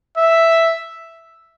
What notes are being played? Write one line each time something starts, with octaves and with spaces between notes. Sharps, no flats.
E5